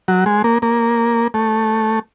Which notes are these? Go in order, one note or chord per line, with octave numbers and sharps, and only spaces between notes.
F#3
G#3
A#3
A#3
A3